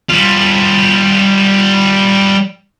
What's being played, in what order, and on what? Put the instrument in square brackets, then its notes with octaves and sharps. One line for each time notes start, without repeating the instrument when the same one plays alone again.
[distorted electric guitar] G3 F4